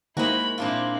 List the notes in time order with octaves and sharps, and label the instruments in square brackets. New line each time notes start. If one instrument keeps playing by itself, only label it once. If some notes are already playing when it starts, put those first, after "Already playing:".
[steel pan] D#3 A#3 C5 [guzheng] G#3 F#4 [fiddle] E4 B5
[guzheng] A#2 D4 F4 [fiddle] C4 E4